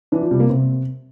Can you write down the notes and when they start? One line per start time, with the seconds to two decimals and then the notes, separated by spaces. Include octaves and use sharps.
0.12 E3 D4
0.21 F3
0.31 C3 G3
0.40 A#3
0.50 C3 C4